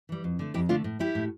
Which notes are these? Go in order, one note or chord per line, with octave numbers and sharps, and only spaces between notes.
E3 G3
F2
D3 A3
F2 E4 G4
D3 A3 D4 F4
A2
G3 E4 G4
A2